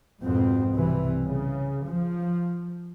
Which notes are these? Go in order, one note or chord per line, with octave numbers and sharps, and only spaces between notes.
F2 G#2 B2 C4
C2 C3 E3 G3
C#3
F3